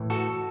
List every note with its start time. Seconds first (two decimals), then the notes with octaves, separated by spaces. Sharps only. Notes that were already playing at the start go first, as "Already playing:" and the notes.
Already playing: A2 E3
0.10 F#4 A4